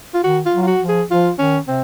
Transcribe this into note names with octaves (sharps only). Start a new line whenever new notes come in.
F4
D#3 F#4
F4
F#3
F4
F#4
F3
G#4
F3 F4
D#3 C#4
C3 C4